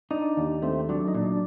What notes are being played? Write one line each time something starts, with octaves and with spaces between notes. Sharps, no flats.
D4 D#4
D#2
A3 C4
F#3 D4
D#4
A#2 D4